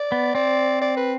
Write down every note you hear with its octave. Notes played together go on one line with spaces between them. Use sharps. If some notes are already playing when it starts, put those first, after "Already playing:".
Already playing: D5
B3
C4 D5
D5
B4